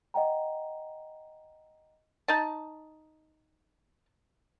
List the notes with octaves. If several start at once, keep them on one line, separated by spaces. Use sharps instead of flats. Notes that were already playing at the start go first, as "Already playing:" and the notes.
D#5 F#5 G5 A#5
D#4 A5